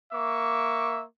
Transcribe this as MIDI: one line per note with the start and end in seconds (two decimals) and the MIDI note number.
0.12 1.03 58
0.12 1.03 76
0.12 1.03 85
0.12 1.03 86